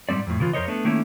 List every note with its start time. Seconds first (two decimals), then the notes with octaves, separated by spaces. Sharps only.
0.09 G#2 C#3 G3 C4 D5
0.27 F2 A2
0.40 C#3 E3 F4
0.53 F2 A#4 C5 C#5 D#5
0.68 A3 B3 D4
0.85 D#3 A3 A#3 C#4 E4